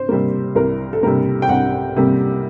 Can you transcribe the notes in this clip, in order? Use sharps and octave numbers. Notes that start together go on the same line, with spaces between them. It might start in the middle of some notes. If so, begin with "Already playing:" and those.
Already playing: C5
C3 G3 A#3
C2 A#4
A4
C3 G3 A#3 A#4
G5
C2 F#5
C3 G3 A#3